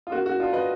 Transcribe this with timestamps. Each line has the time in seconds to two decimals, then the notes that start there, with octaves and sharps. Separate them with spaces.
0.07 F4
0.12 A#3 F#4
0.26 F#4
0.39 D4 F4
0.53 B4 D#5